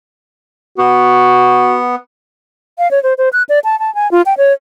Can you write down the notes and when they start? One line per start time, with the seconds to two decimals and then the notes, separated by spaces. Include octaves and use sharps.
0.78 B3 F#4
2.78 F5
2.91 C#5
3.03 C5
3.18 C5
3.33 F#6
3.49 D5
3.64 A5
3.79 A5
3.95 G#5
4.11 F4
4.26 G5
4.38 C#5